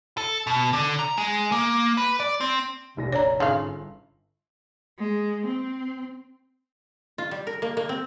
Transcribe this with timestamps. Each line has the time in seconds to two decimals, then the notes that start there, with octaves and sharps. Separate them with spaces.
0.17 A4
0.47 B2
0.73 D3
0.99 A#5
1.17 G#3
1.52 A#3
1.97 B4
2.20 D5
2.41 C4
2.97 F1 A#1 C3 A#6
3.13 D4 C#5 D5 A#5
3.40 G1 G#2 C#3 F5 C6 F#7
4.99 G#3
5.46 C4
7.18 F4
7.31 G3
7.47 A#4
7.62 A#3
7.77 A#3
7.89 C4